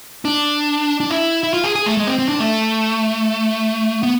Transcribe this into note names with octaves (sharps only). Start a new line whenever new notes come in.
D4
D4
E4
E4
F4
G#4
G#4
A3
G#3
C4
C4
D4
A3
B3